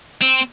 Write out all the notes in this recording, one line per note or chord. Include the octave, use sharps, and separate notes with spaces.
C4